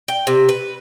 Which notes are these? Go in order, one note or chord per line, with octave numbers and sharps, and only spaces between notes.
G5
C3
B4